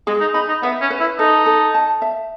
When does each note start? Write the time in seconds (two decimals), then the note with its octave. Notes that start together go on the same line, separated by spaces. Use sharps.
0.07 G#3 G#4
0.21 D#4
0.34 D#4 B5
0.48 D#4
0.63 B3 E5
0.82 C#4
0.90 B4
1.00 E4
1.19 D#4 A4
1.46 A4
1.74 A5
2.02 E5